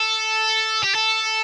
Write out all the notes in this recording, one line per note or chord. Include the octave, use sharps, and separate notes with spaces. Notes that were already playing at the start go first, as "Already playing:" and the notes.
Already playing: A4
G4
A4